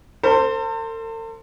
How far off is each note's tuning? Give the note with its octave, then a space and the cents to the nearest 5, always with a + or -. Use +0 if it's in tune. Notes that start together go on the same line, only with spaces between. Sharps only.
A4 +45 C5 +0